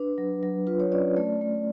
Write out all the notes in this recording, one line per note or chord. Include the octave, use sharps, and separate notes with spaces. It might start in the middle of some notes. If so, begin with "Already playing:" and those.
Already playing: D4 B4
F#3
F#3
F4 B4
C#5
C#4 D5
A3 D5
A3